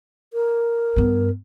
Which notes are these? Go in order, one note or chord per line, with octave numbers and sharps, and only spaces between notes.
A#4
G2 B3